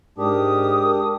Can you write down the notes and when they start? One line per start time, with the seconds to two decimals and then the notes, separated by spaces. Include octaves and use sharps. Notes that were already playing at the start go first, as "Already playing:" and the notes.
0.18 G#2 D4 G4 A#4 D#6